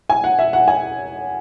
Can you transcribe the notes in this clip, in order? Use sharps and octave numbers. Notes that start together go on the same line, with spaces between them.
G#5
F#5
E5
F#5
G#5